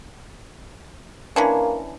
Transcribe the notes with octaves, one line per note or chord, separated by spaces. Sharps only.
E3 A#3 C#4 D4